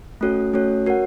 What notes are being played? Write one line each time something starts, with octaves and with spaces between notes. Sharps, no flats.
A3 C#4 F#4 A4 C#5
A3 C#4 F#4 A4 C#5
F#4 A#4 C#5 F#5